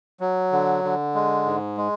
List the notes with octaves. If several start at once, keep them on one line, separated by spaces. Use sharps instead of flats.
F#3
D3
D3
G#3
G#2
G#3